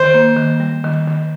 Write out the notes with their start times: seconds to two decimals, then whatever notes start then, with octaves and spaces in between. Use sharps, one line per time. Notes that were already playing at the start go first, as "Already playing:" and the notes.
Already playing: D#3 C5
0.14 A#3
0.37 D#3
0.60 G3
0.84 D#3
1.07 D#3